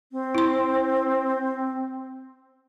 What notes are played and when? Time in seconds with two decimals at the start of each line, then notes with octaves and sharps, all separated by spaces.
0.12 C4
0.35 E4 C6